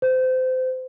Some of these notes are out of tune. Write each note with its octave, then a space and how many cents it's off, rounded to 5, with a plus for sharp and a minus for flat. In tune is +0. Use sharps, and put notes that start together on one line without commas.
C5 -25